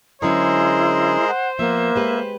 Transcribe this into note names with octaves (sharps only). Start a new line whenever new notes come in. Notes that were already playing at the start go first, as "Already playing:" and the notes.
D3 F#3 G#3 C#4 E4 G#4 A#4 C5
F#5
F3 A#3 B3 E5
G#3 G4 B4